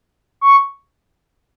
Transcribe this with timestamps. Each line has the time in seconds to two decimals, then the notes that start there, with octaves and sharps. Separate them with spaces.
0.41 C#6